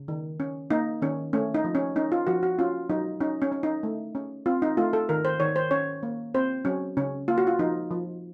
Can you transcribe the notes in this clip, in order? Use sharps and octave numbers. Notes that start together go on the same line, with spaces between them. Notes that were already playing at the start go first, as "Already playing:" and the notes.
Already playing: C#3
D#3
C#4
A#3 D#4
D#3 C#4
A3 C#4
D#4
F3
C#4
C#4 D#4
F4
F3 F#4
F#4
C#4 F4
F#3 D#4
C#4 D#4
C#4
C#4
D#4
A3
C#4
C4 F4
D#4
A3 F4
A4
D#3 A#4
C5
D#3 C#5
C5
C#4 C#5
A#3
C4 C5
F#3 C#4
C#3 C#4
A#3 F4
F#4
F4
F3 D#4
F3